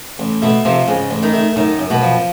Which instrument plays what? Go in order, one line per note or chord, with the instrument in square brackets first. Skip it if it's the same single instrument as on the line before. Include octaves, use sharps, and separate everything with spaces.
[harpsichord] A1
[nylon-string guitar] B2 B3 [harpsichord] A3
[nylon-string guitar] C3 C4 [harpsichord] F3
[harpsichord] G#2 [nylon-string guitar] C#3 C#4
[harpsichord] A1
[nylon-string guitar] D#3 D#4
[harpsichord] A3
[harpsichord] F#2 [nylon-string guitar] D#3 D#4
[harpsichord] F#2
[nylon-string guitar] B2 B3
[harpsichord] F3